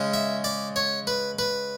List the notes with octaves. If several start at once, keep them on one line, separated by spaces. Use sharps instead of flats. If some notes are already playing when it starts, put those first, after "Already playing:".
Already playing: C#3 G#3 C#4
E5
D5
C#5
B4
B4